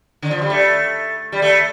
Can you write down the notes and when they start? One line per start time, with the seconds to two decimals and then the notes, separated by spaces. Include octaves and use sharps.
0.22 D3
0.31 F3
0.41 G3
0.50 A3
1.32 G3
1.42 A3